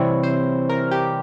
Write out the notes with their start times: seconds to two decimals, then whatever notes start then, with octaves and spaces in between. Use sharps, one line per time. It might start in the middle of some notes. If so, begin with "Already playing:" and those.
Already playing: C3 E3 G3 C4 E4 C#5
0.23 C5
0.69 A#4
0.91 G4